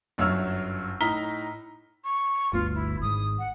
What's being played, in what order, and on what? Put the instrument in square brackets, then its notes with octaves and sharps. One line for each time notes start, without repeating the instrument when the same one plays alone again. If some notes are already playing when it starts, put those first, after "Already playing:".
[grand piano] G1 F#2 F#3 C#5 E6 F6
A2 D#4 A#5 F6 B6 G7
[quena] C#6
[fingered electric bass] G1 D2 B3 [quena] F4
[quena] E4
[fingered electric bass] G#1 G#2 [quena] D#6
[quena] F#5